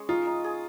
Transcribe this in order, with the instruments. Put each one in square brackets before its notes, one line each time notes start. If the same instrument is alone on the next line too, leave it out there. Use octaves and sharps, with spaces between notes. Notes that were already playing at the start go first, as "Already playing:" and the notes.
Already playing: [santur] G#3 C#4 C#5 D#5
[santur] D#4 [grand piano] F4
[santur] D#4
G#4